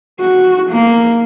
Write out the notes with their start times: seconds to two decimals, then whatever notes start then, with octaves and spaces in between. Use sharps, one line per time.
0.21 F#4
0.71 A#3